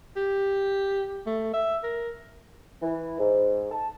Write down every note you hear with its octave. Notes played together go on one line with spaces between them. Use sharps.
G4
A3
E5
A#4
E3
G#2
A5